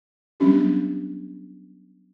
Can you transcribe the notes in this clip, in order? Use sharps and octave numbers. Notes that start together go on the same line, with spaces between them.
F#3 G3 B3 C#4 D4 G4